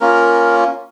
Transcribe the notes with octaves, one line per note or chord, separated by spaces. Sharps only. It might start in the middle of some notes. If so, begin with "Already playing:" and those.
A#3 C#4 F4 A#4